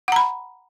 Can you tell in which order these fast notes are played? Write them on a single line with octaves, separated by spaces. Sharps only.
F#5 A#5 B5